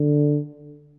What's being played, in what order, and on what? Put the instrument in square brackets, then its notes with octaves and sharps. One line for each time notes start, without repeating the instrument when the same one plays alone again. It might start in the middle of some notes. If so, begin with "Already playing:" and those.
Already playing: [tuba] D3